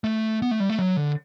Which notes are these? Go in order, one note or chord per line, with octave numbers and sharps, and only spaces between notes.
A3
B3
A3
G3
A3
F#3
D3